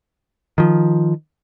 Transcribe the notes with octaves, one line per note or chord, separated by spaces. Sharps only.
D#3 F3